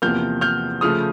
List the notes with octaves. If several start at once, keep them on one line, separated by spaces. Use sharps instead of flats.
E2 C3 F3 A#3 F6 G6
F6 G6
C#3 F3 A3 D#6 F6